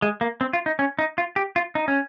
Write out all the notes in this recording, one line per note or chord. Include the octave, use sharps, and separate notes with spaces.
G#3
A#3
C4
F4
D#4
C#4
D#4
F4
G4
F4
D#4
C#4